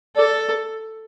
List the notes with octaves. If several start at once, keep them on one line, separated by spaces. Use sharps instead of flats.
A4 D5